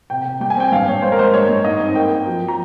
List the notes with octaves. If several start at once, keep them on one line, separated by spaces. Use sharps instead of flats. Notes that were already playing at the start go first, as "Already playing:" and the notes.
C3 G5
C3
G3 G5
G#5
C4 G5
G2 F5
G2 C#5
G#3 C5
A#4
G#3 C5
G2 C#5
G2
G#2 D#5
C4
A#3 G5
A#3
F3
F3
A#5